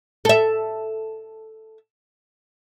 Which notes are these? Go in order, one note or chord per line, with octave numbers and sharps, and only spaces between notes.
A4 E5